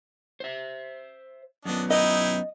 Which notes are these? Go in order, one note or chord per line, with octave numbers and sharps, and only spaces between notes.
C5 E5
F#2 B3 D4 D#5
D#4 E4 D#5 G5